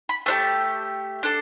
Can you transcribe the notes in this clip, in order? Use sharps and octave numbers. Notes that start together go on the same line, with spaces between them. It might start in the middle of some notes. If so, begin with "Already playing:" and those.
B5
A3 D4 G4 A5
D4 A4